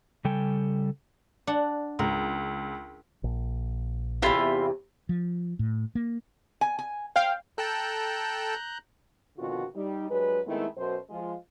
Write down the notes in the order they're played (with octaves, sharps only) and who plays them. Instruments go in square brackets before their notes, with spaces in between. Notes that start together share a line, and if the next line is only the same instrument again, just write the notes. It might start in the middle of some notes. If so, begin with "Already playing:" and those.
[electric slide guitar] C#3 G3 A4 G5 G#5
[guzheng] D4 F#5
[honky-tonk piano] C#2 [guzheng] A#4
[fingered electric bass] A#1
[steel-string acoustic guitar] E2 C3 [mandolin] E4 F4 B5
[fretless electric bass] F3
A2
A#3
[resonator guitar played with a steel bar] G#5
G#5
[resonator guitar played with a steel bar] C5 [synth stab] F5 G5
[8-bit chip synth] A4 G5 A5 [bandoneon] A#5 F#6 G6
[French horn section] F2 B2 D3 D#3 F4 F#4
G3 D#4
G2 F#3 G#3 B4
D#3 G#3 A3 B3 C4 E4
F#2 B2 C5
F3 G#3 F4